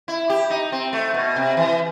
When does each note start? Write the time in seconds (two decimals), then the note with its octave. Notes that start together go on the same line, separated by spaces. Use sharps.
0.08 E4
0.30 G4
0.50 D#4
0.72 C4
0.93 A3
1.14 B2
1.36 C3
1.57 E3